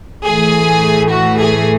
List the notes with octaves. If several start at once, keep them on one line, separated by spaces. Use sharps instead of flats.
A2 E3 A3 G#4
F#4
G#4